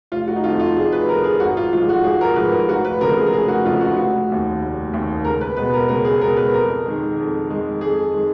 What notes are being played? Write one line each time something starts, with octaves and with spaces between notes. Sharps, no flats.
F1 F4
F#4
D#4
F2 F3 F4
F4
F1 G#4
B4
F2 F3 A#4
G#4
G#1 F#4
F4
G#2 F3 G#3 F4
F#4
G#1 G#4
A#4
G#2 F3 G#3 B4
A#4
F1 F#4
B4
F2 C#3 F3 G#3 A#4
G#4
A#4
F1 G#4
F#4
F2 C#3 F3 G#3 F4
F#4
F1 F#4
D#2 D#3
F1
D#2 D#3
C#2 A#4
B4
B2 G#3 B4
A#4
C#2 A#4
G#4
B2 G#3 A#4
B4
F2 A#4
D#3 G#3
F2
D#3 G#3
F2 G#4
D#3 G#3